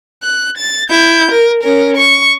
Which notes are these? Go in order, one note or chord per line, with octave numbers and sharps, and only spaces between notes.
F#6
A6
E4 G6
A#4
C#4 A#4
C#6